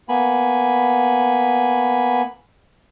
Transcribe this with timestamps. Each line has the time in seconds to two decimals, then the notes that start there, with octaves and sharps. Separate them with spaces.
0.09 A#3 B3 G#5 B5